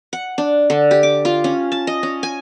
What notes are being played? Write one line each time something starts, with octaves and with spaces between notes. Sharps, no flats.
F#5
D4
D3
G4
D6
F4
C#4
A5
D#5
C#4
G#5